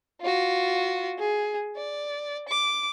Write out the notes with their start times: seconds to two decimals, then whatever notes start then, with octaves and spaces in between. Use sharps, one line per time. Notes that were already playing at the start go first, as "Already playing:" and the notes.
0.21 F4 F#4
1.18 G#4
1.76 D5
2.48 D6